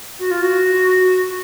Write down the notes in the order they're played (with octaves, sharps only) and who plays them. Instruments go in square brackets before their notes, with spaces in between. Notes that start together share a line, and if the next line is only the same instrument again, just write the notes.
[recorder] F#4
F4
F#4